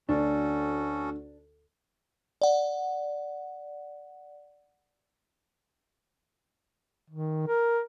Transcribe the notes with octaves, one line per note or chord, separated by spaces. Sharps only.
D2 C#4 D4 F#4 A4
D5 F#5
D#3
A#4